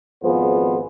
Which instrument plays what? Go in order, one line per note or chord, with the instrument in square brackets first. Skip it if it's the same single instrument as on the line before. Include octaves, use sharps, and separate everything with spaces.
[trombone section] G#1 F2 F3 B3 G#4 C5